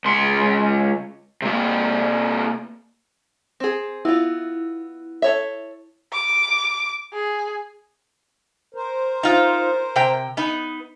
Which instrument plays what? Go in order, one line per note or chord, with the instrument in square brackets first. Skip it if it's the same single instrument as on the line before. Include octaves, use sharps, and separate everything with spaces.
[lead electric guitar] C#2 C6
C3 A#3
[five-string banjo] C4 G#4
[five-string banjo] B3 F4 [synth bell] E4
[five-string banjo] A4 C#5 E5
[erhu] D6
G#4
[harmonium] A#4 C5
[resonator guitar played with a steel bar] D#4 F4
C3 G5
B3 D#4